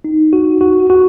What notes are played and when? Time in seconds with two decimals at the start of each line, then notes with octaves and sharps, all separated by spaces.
0.04 D#4
0.33 F#4
0.61 F#4
0.90 F#4